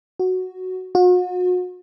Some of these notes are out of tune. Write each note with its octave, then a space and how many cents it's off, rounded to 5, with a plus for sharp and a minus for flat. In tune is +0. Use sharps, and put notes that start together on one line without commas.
F#4 +0
F#4 -40